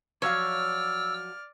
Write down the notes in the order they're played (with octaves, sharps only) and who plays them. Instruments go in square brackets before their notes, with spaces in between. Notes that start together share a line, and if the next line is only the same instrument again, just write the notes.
[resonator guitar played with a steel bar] F3 F#3 F5 [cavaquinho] C#5 [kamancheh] D5 F6 [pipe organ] E6